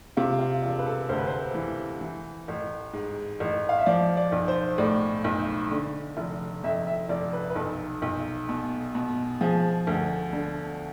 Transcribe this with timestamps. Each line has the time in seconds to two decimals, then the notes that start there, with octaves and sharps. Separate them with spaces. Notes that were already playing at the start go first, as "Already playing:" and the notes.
0.17 C3 F4
0.39 F4
0.62 E1 F4
0.79 B4
0.86 A4
1.09 D2 C5
1.18 B4
1.27 C5
1.55 E3
2.01 E3
2.48 A1
2.93 G#2
3.40 A1
3.69 F5
3.78 E5
3.86 F3 D5
4.17 D5
4.32 B1
4.48 C5
4.78 A2 D5
5.24 B1
5.72 D3
6.17 F1
6.63 F2 E5
6.87 E5
7.09 F1 D5
7.33 B4
7.50 B4
7.55 B1 A4
8.02 B1
8.49 B2
8.95 B2
9.41 F3 G#4
9.87 D2
10.33 D3